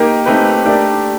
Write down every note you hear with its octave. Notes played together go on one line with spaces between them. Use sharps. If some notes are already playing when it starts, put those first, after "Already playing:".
Already playing: A#3 D#4 G4 A#4
A3 C4 D#4 G4 B4
A3 D4 G4 A#4 D5